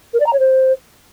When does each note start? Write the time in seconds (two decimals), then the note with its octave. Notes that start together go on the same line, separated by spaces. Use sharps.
0.13 A#4
0.20 D5
0.26 A#5
0.33 C#5
0.39 C5